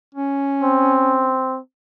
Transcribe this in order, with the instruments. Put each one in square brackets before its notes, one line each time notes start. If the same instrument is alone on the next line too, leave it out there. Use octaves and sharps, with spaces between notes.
[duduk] C#4
[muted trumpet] C4